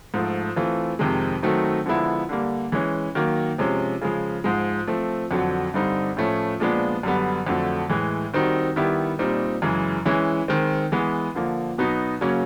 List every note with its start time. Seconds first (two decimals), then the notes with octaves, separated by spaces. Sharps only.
0.14 G#2 F3 A3
0.56 E3 A3 C4 F4
0.99 F2 C3 D#3 G#3
1.43 D#3 F#3 A3 C4 D#4
1.86 D3 F3 G#3 B3 E4
2.29 D3 G3 A#3
2.72 E3 G#3 C#4
3.15 D#3 F#3 A#3
3.58 C3 F3 G#3 C#4
4.01 C#3 F3 G#3
4.44 G#2 F3 G#3
4.87 F3 A3 C4
5.31 F2 D3 F#3
5.74 G2 D3 G3 C4 D#4
6.17 A2 F3 A3 C#4
6.60 A#2 F3 G#3 B3 D4
7.03 F#2 D3 G3 B3
7.47 F2 D3 F#3 A3
7.90 A2 E3 G#3
8.33 D#3 G3 C4 D#4 F#4
8.76 D#3 G3 B3 E4 G4
9.19 A#2 G3 C4 D#4
9.62 F#2 C#3 E3 G#3
10.05 E3 G#3 C#4 E4
10.48 D#3 G#3 C4
10.92 E3 G#3 B3
11.35 D3 F3 A#3
11.78 B2 F#3 B3 D#4 F#4
12.21 C#3 F#3 A#3 C#4